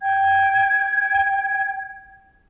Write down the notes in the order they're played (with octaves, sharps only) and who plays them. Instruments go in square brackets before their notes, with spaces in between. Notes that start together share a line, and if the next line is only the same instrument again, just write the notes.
[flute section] G5 G#6